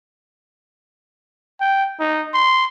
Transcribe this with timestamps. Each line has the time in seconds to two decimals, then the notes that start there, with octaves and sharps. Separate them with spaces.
1.61 G5
2.00 D#4
2.34 C6